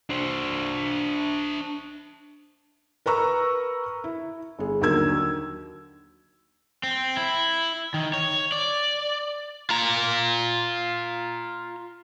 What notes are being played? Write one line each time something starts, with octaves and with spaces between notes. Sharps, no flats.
D4 C5
A#4 B4 A#5 C#6 E6
E4
G1 G#4
D#2 D3 F#3 A#4 E6 G#6
C4
E4
D#3
C#5
D5
F4 A#5